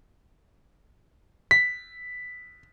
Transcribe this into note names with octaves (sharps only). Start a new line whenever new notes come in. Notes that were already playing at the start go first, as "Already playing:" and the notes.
B6